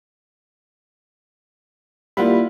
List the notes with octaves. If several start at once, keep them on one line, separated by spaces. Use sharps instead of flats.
G3 A#3 E4 F4 F#5 B5